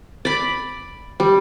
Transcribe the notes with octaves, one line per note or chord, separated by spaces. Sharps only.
D5 B5
G3